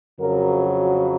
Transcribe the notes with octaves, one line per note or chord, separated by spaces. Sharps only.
F2 C#3 F#3 A#4
F#4